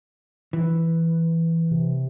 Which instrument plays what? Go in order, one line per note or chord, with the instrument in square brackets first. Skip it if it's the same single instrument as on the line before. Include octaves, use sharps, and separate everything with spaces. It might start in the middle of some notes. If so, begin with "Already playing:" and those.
[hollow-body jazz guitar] E3
[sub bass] C3